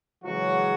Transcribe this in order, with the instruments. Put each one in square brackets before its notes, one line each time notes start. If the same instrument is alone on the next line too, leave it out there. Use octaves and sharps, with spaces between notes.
[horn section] C#3 E3 F#3 G#3 F#4